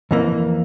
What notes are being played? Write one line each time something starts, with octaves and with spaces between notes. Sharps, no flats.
F2 E3 A#3